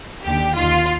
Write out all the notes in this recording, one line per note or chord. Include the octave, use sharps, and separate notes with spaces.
D#2 D3 G4
D#2 D#3 F4